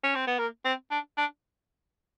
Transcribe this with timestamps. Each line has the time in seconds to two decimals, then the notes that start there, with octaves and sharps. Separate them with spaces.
0.04 C#4
0.16 C4
0.27 B3
0.39 A#3
0.65 C4
0.91 D4
1.17 D4